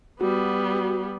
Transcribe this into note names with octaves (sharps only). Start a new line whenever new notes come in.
G3 B3 F#4